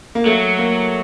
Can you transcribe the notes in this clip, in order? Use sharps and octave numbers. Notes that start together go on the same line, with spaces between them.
A#3
F#3 A3
A#3